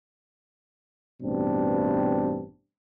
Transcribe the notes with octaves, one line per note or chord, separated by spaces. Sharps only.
A1 G2 B2 C4 D4